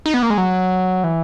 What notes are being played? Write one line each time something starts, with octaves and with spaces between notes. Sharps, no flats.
D#4
B3
A#3
G#3
F#3
E3